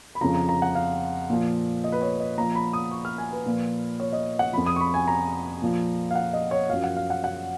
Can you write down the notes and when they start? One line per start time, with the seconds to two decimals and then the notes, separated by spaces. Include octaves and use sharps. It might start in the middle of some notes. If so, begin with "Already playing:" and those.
0.15 B5
0.21 F2 C#3 F3 A#5
0.34 A#5
0.49 A#5
0.62 F#5
0.75 F5
1.30 A#2 F3
1.84 D#5
1.92 B4
2.02 C#5
2.20 D#5
2.38 A#2 F3 A#5
2.55 B5
2.73 D#6
2.91 C#6
3.05 F6
3.18 G#5
3.32 B4
3.46 A#2 F3
4.00 C#5
4.13 D#5
4.39 F#5
4.53 F2 F3 B5
4.66 D#6
4.76 C#6
4.81 B5
4.94 G#5
5.08 A#5
5.62 A#2 F3
6.11 F5
6.15 F#5
6.33 D#5
6.51 C#5
6.69 F#2 F3 F5
6.84 F#5
6.97 F5
7.10 F#5
7.24 F#5